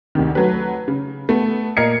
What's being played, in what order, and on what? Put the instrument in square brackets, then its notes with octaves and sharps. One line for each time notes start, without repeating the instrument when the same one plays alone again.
[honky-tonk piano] D2 C3 D#3
F#3 A3 B4
C#3
A3 B3
A#2 A#4 D#5 G#6 C7 C#7